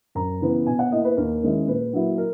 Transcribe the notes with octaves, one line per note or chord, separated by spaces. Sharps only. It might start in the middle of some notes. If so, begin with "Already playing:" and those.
F#2 A#5
C#3 E3 B3
B2 G#5
F#5
A#3 E4 D#5
B4
D#2 A#4
D#3 G#3 C#4 E4
A#2 B4
F#3 A#3 E4
A#4